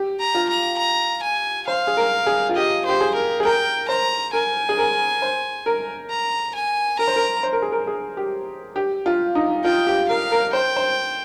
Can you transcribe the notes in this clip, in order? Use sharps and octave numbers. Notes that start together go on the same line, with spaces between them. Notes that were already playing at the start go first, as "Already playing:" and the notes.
Already playing: G4
A#5
F4
A#5
A#5
G#5
C5 F5
G#4
A#4
G#4
F4
G4 D#5
G4 C5
G#4
A#4
G#4
A#4 G5
C5 A#5
A#4 G#5
G#4
A#4
C5
A#4
A#5
G#5
A#4 A#5
C5
A#4
C5
A#4
G#4
A#4
G#4
G4
G4
F4
D#4
F4 G5
G4
A#4 F5
A#4
C5 G5
C5